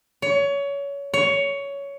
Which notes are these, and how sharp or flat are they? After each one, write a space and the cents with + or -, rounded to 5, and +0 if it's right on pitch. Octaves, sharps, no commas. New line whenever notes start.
C#5 +25
C#5 +15